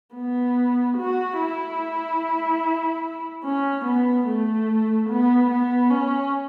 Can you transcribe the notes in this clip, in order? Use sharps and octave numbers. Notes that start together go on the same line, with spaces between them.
B3
F#4
E4
C#4
B3
A3
B3
B3
C#4